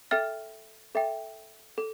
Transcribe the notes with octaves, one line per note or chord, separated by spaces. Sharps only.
A4 E5 G5 F6 A6
A4 E5 G5
A4